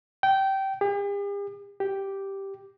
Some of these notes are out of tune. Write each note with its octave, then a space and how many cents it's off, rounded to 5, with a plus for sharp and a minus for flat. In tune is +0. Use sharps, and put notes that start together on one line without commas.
G5 -20
G4 +45
G4 -5